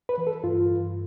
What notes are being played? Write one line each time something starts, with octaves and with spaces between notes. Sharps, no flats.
B4
E3
A4
G2 F4
G2